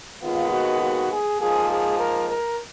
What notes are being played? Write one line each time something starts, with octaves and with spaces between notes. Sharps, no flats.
D#2 D#3 G#3 B3 F4
F#4
F#4
G#4
G#2 F3 A#3 G#4
G#4
A#4
A#4